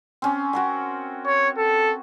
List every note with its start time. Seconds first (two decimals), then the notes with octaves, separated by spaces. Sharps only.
0.22 C4 C#4
0.53 F#4 A#4 F#5
1.26 C#5
1.58 A4